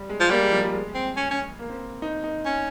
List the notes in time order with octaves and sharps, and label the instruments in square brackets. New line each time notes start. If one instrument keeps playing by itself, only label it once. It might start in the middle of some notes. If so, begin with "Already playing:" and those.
Already playing: [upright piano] G3
G#3
[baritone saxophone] F3
[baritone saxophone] G3 [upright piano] A#3
[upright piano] G#3
F3
G3
G#3
[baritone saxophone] C4
C#4
C#4
[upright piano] A#3
C4
D#4
D#4
[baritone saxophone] C#4